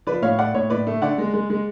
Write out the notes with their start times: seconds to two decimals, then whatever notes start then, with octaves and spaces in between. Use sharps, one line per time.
0.07 F3 B4 D5
0.22 A2 C#5 F5
0.39 A2 D5 F#5
0.55 A2 C#5
0.70 A2 B4 D5
0.87 A3
1.02 D3 D5 F#5
1.18 G#3
1.34 G#3
1.50 G#3